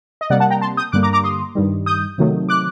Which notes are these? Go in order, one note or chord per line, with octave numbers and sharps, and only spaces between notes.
D#5
C3 G3 A#3 D5 F#5
F#5 A5
G5 A#5
A5 C6
D#6 G6
G2 D3 G3 A#3 D6 F#6
A#5 D6
A#5 D6
C6 D#6
G2 D#3 G3
D#6 G6
C3 D#3 F#3 A3
D6 F#6